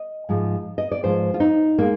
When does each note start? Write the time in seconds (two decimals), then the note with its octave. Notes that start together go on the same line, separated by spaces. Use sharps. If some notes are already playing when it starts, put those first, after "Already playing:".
Already playing: D#5
0.29 G#2 F3 G#3
0.78 D#5
0.92 D5
1.03 G#2 F3 G#3 C5
1.34 F4
1.40 D#4
1.78 F3 G#3 A#3